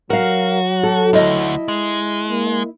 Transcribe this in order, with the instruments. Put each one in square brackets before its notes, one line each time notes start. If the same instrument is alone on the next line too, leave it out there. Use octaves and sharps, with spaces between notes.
[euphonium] F#3 [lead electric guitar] F#4 [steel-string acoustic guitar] A#4 F5
[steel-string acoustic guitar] A4
[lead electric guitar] D2 [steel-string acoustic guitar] E4 D#5
[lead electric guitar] G#3
[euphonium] A#3